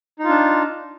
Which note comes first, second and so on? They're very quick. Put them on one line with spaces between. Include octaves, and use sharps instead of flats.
D#4 F4 D4